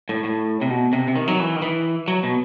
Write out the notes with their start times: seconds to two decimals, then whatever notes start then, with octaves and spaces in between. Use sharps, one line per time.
0.09 A2
0.24 A2
0.61 C3
0.70 B2
0.93 C3
1.08 C3
1.16 D#3
1.28 F#3
1.40 E3
1.56 D#3
1.62 E3
2.08 F#3
2.23 B2